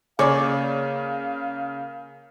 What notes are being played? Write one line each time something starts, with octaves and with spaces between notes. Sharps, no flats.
C#3 A#3 C#4 G#4 C#5 D5 F5